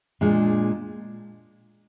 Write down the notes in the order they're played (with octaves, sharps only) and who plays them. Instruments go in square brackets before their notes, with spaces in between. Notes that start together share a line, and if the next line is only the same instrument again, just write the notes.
[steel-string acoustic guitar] A#2 G#3 D4